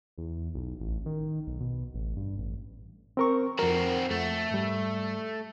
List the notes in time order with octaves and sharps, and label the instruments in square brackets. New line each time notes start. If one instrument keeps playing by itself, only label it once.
[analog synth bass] E2
B1
A1
D#3
B1
B2
A1
G2
A1
[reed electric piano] C4 A#4 C#6
[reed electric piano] F2 A#4 [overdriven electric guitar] C4 F#4
[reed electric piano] F2 [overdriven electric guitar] A3
[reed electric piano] G#2 G3